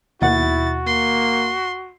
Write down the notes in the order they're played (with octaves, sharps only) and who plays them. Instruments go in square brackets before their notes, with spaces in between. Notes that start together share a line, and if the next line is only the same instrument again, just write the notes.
[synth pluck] D#2 B2 F#5 [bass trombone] E4 [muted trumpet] F#4 [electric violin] A6
[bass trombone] A#3 [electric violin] C6